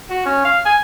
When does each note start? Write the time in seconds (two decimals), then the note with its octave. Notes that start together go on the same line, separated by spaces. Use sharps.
0.10 F#4
0.26 C#4
0.45 F5
0.66 G#5